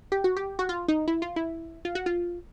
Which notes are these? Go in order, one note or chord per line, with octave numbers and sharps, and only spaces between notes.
G4
F#4
G4
F#4
F4
D#4
E4
F4
E4
F4
F#4
F4